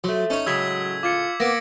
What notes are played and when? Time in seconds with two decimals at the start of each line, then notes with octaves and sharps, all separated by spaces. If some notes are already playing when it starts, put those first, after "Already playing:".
0.04 F3 F#3 A3
0.30 C#4 D#4 C#5
0.46 A2 C#3 F#3 G#3 E6 G#6 B6
1.03 F4 D6 G#6 C#7
1.40 A#3 B3 A#6 D7